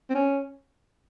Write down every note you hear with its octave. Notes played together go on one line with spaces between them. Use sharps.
C4
C#4